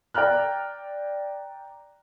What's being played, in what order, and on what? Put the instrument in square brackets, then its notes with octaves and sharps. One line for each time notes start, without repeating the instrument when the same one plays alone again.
[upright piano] D5 G5 A#5 F6 F#6